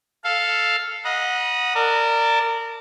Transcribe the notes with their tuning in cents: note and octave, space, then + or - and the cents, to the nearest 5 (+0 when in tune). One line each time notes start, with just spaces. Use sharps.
A4 +0 F5 +0
D#5 +0 F#5 -15 B5 -40
A#4 -25 D5 +0 A5 +0